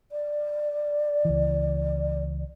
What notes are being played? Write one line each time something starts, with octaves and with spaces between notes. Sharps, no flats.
D5
C#2 E3